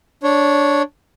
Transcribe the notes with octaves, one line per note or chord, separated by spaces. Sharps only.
D4 C#5